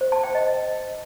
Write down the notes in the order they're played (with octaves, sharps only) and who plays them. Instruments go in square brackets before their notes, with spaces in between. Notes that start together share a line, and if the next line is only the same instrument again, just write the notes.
[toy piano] C5
A5
G5
D#5